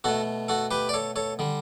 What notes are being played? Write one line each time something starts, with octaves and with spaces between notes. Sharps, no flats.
B2 A3 F#4 A4
F#4 A4
G4 B4
D5
A4 C#5
A4 C#5
D3 G3